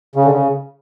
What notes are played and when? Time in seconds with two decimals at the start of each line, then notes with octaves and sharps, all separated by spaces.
0.16 C#3
0.25 D3
0.31 C#3